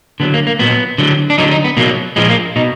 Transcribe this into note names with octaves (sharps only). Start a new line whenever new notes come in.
D3 F#3 B3
A#3
A#3
A#2 F#3 B3
D3 F#3
D4
D3 F#3 D#4
D#4
B3
B2 F#3 A#3
A#2 F3 G#3 B3
A#3
B2 D#4